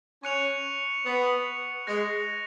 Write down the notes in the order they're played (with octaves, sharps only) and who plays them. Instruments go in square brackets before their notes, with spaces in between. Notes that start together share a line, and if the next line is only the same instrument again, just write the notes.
[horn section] C#4 [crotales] C#6 F#6 C#7 F7
[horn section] B3
[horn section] G#3 [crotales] F#6 A#6 F7